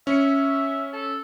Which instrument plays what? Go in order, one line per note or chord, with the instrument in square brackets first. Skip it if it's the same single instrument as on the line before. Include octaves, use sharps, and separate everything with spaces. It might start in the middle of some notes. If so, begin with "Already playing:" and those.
[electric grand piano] C#4 C#7 [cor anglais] E5
[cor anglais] A4